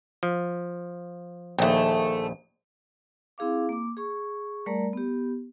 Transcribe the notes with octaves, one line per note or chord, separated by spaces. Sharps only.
F3
A#1 D#2 A3 G5
C4 E4 G#4 F5 D6
A#3 D6
G#4 C#6
G3 A3 A#4 D5 A#5
B3 G4